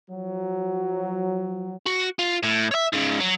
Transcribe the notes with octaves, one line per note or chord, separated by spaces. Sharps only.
F3 F#3
F#4
F4
A2
C#5 E5
G#2 C#3
F#3